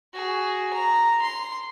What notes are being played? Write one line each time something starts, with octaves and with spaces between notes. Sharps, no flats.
F#4 G#4
A#5
C6